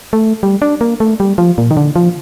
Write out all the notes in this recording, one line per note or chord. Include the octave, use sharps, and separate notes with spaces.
A3
G3
D4
A#3
A3
G3
F3
A#2
D#3
D3
F3